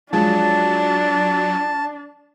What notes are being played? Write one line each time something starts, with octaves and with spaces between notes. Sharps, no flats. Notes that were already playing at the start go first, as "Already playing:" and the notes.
F3 F#3 G#3 D4 A5